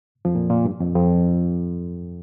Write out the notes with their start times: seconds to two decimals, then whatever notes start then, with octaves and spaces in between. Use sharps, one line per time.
0.25 F2 F3
0.35 A#2
0.50 A#2
0.65 G2
0.80 F2
0.95 F2